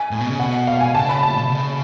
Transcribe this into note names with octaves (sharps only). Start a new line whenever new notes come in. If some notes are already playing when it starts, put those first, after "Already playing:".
Already playing: G#5
A2
B2
C#3
B2 F#5
F5
G#5
C#3 A5
B5
A2 A5
B2
C#3